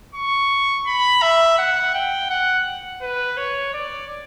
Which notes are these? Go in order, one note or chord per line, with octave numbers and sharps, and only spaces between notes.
C#6
B5
E5
F#5
G5
F#5
B4
C#5
D5